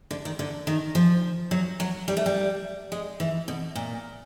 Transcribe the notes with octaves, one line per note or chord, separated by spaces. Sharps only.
D3
D#3
D3
D#3
F3
F#3
F#3
G3
A3
G3
G#3
E3
B2
A#2